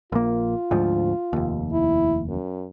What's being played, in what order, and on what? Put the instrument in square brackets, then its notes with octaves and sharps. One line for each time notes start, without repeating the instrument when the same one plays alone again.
[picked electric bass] A#1 A#3 [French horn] F4
[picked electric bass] D2 G#2 F3
F1 D#2
[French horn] E4
F#2